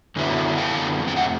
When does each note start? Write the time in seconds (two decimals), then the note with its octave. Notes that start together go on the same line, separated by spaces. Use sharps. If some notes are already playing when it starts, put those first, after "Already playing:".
0.16 F#2 D3 F#3 B3 E4
0.58 F5 G5
0.99 F2 C3
1.08 G5
1.16 E5 F#5